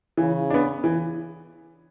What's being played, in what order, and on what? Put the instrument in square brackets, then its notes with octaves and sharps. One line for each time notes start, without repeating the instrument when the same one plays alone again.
[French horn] C#3 [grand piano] E3
[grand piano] B3 D4
E3